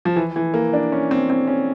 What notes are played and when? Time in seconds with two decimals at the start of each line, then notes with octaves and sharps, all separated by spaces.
0.05 F3
0.16 E3
0.36 E3
0.54 A#3
0.73 D4
0.92 C#4
1.11 C4
1.30 C4
1.47 C#4